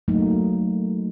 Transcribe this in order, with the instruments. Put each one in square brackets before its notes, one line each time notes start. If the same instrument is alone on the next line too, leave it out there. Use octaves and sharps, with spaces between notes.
[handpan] F#3 A3 A#3 D#4